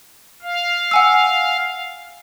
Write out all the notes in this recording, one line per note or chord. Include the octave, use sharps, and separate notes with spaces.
F5
F#5 G#5 E6